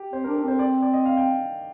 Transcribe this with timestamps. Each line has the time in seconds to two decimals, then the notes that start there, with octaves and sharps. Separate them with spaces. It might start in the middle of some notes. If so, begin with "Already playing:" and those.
Already playing: G4
0.13 C4 C5
0.24 A#4
0.28 D4
0.36 A4
0.44 C4 C5
0.59 D5
0.82 D5
0.93 D#5
1.06 F5
1.17 G5